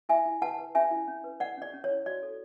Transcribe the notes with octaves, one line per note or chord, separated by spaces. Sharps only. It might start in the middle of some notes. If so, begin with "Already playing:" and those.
E4 E5 G#5
E4
B4 F#5 A5
B4
C#4 E5 G#5
E4
C#4
B4
C#4 D5 F#5
C#4 D5
C#4
C#5
E4
F#4 D5
A4